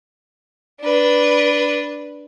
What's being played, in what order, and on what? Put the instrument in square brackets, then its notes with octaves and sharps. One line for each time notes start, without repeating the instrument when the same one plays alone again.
[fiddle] D4 B4